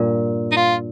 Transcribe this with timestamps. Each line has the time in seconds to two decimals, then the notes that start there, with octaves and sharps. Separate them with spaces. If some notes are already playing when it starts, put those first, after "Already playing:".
Already playing: G2 A#2
0.52 D#4
0.56 F4